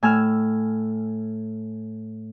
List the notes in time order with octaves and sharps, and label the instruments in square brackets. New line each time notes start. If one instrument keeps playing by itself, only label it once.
[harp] A2 G#5 E6 F6